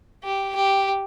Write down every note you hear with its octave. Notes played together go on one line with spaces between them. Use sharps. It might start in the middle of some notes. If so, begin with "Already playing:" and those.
G4
G4